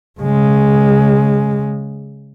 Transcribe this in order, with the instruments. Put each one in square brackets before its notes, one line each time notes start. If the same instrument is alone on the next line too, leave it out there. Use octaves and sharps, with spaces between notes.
[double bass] C#3 G#3